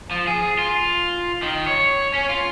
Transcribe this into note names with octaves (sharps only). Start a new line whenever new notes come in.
F3
G#4
F4
D#3
C#5
C#4
F4